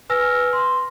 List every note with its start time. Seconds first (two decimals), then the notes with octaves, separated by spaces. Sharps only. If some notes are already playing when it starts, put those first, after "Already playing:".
0.10 B4 G#5 E6 F6 A#6
0.53 C6